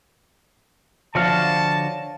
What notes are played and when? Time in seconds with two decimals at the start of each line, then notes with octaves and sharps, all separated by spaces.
1.15 D3 F3 F#4 C#5 D5 F5 A5 F6